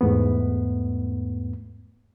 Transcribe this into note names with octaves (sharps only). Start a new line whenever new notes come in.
E2 G#2 A3 B3